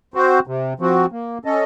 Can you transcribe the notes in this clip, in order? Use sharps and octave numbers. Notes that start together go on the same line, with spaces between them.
C4 F#4 C5
C3
F3 C4 F#4
A#3
C#4 A4 D#5